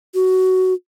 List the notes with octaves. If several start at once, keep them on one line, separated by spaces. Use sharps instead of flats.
F#4